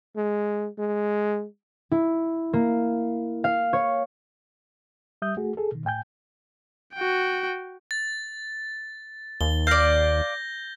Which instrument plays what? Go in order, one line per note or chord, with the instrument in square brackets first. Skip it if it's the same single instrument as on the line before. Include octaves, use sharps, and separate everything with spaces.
[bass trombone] G#3
G#3
[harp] E4
A#3
F5
C#5
[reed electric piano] G3 E5 D#6 G6
A3 F#4 G#4
G#4 A4
B2 D#3
A2 G5 G#5 G6
[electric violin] F#4 G5
[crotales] A6
[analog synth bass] D#2 [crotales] G7
[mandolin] D5 F5 [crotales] G6 A#6